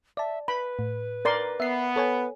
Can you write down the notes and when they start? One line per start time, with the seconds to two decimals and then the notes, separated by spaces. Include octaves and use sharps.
0.17 D5 E5 A5
0.48 B4 B5
0.79 A2
1.25 A#4 D5 C6
1.60 B3 E5 C7
1.96 A4 C#5 G#5